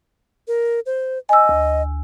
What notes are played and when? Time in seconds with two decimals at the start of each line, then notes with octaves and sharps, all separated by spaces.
0.48 A#4
0.86 C5
1.29 D#5 G#5 E6
1.49 D2